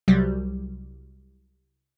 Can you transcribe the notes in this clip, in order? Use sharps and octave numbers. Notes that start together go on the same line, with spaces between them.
C2 F#3 G3